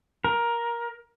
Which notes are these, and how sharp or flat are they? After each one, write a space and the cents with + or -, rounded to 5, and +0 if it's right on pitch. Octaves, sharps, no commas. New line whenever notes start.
A#4 +15